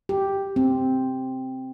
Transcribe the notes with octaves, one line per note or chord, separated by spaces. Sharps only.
G4
C4